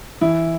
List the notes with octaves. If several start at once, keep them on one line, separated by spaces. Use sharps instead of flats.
E3 E4